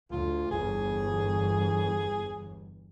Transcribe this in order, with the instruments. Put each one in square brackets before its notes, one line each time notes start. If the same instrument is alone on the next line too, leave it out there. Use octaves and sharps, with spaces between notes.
[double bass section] D2 [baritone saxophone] F4
[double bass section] G1 E2 [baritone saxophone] G#4